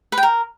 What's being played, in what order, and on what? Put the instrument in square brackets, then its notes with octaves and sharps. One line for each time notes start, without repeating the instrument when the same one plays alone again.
[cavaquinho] B4
G5
A#4